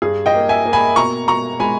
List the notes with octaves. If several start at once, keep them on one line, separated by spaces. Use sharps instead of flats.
G2 G#4
D#5 G5
A#3
E5 G#5
A#3
G#5 B5
B2 A#5 C#6
B2 A#5 C#6
G#3 G#5 B5